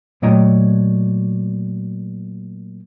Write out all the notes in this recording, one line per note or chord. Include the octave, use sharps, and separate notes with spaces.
A#2 F#3 A3 D#5 G5 A#5